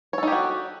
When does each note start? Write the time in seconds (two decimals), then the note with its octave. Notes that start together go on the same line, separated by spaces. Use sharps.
0.13 C#5
0.18 A4
0.23 D#4
0.28 G4
0.32 F#4